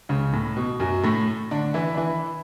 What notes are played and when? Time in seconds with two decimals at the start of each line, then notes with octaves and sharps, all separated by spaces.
0.09 C#2 C#3
0.34 A2
0.57 B2
0.80 F#2 F#3
1.04 A2 A3
1.51 D3 D4
1.74 E3 E4
1.94 D4
1.97 E3 E4